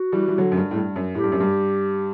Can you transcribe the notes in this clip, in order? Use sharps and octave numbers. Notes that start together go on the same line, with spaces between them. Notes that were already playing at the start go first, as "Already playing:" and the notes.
Already playing: F#4
E3 G3
E3
D3 F#3
F#2
G2
A2
G2
F#2
A2 G4
G2
F#2
G2